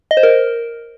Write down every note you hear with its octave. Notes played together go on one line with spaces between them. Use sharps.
D#5
C5
A#4